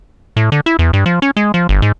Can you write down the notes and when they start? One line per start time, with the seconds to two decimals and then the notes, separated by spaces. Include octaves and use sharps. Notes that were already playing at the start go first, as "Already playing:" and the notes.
0.37 A2
0.52 D3
0.66 E4
0.79 E2
0.93 G2
1.06 F3
1.22 C#4
1.37 G#3
1.54 F3
1.69 G1
1.82 G#2